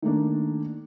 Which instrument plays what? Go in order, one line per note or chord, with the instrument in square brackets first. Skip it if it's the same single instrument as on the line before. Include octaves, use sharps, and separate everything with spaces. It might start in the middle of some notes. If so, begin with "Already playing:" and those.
[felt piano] D#3 A3 A#3 D4